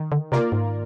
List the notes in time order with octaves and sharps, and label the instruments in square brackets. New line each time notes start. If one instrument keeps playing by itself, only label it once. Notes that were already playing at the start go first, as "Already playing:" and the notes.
Already playing: [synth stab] D#3
[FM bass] D3
[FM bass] C3 [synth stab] A#3 F4 A#4 D5
[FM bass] G#2